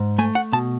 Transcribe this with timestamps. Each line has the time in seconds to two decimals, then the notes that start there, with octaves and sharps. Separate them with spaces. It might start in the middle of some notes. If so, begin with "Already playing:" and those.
Already playing: G#2
0.18 A3 G#5
0.35 F#5
0.52 B2 A5